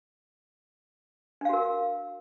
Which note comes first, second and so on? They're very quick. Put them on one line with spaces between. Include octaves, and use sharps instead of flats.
D4 F5 F#4 A#4